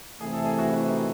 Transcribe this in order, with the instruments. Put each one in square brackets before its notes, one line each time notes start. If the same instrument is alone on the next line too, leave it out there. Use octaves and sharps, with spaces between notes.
[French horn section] C3 E3 A3 [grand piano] G#4
[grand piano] A4
G#4
F#4
E4
D#4